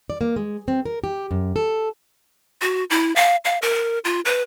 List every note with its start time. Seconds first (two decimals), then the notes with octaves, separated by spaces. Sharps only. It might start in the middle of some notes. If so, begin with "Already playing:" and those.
0.10 D5
0.21 A#3
0.36 G#3
0.68 C4
0.85 A#4
1.04 G4
1.31 F#2
1.56 A4
2.62 F#4
2.90 E4
3.16 F5
3.45 F5
3.62 A#4
4.05 F4
4.25 B4